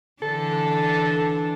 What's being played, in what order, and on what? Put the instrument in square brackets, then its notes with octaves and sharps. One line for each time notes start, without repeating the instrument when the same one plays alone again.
[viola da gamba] D3 E3 D4 [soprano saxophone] A4